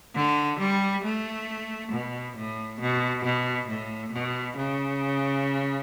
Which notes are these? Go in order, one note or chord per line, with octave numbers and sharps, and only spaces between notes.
D3
G3
A3
B2
A2
B2
B2
A2
B2
C#3